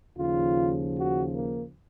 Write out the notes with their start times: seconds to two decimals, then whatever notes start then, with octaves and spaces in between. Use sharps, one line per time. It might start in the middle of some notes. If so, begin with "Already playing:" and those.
0.17 D#2 C#3 F3 F4
0.96 F#4
1.34 A#3